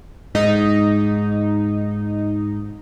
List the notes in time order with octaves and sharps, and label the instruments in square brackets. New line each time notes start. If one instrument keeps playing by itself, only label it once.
[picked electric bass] G#2 [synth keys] D#4